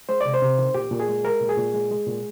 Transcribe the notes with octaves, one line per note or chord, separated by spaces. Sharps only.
G#3 C5
C3 D5
C5
C3
D#3
A#2 G4
A#2
G#4
G#3
G#3 A#4
A#2
G#4
A#2
G#3
G#3
A#2